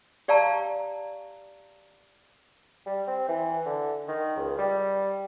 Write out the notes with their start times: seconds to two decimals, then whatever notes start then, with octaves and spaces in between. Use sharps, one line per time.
0.28 G4 D5 F5 A5 A#5
2.86 G3
3.07 C4
3.28 E3
3.66 D3
4.08 D#3
4.36 C#2
4.58 G3